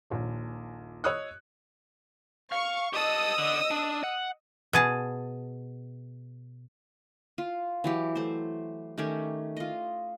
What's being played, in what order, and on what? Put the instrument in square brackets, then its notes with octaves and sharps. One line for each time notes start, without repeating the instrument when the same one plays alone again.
[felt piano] D#1 A#1
C#5 D#5 D#6 E6 F#6
[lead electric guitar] F5 [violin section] C#6
[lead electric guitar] G4 A5 [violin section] D#5 D#6 E6
[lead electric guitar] D3
D4
F#5
[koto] B2 G#4 A5
[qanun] F4
E3 F#3 G4
A3 C5
D#3 A3 C#4 G4
F4 D#5